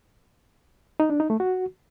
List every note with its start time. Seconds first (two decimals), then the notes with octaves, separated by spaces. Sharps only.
1.00 D#4
1.10 D4
1.20 D#4
1.30 A3
1.40 F#4